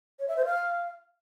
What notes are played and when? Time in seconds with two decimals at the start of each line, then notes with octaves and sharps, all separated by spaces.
0.19 C#5
0.28 E5
0.37 C5
0.45 F5